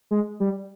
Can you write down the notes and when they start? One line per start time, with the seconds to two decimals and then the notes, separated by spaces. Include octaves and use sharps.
0.11 G#3
0.40 G3